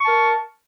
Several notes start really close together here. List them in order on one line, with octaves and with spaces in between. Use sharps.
C#6 A5 A#4